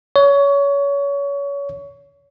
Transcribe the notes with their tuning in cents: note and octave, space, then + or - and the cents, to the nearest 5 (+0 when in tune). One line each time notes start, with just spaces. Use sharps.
C#5 +25